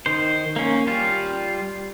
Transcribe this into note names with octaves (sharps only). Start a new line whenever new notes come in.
D#3 C5
A#3 C#4
G3 F4